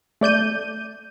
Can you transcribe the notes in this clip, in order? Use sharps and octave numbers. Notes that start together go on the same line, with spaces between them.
A3 D5 G6 D#7